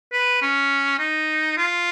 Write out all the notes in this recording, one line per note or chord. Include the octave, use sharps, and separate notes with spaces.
B4
C#4
D#4
F4